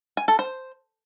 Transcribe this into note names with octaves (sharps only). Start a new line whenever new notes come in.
G#5
A4
C5